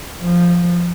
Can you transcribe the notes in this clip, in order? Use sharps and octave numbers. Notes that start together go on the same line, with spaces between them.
F3